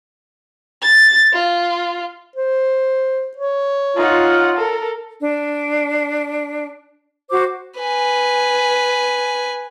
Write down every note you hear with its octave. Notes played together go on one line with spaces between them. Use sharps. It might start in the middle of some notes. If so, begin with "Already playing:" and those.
A6
F4
C5
C#5
D#4 F4 F#5
A4 A#4
D4
F#4 C5 D6
B4 G#5